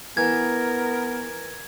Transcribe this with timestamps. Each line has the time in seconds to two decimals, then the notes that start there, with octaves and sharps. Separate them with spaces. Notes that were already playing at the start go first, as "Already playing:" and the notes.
0.17 E3 B3 A#4 G#6